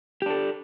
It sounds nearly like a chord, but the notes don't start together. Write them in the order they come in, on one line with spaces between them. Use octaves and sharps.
G4 D4 A4